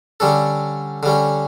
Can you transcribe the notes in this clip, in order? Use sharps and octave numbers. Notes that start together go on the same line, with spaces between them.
D3 G3 C#4 A4
D3 G3 C#4